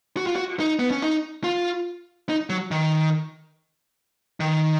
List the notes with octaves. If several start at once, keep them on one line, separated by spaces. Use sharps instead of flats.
F#4
F4
F#4
D#4
B3
C#4
D#4
F4
D#4
F#3
D#3
D#3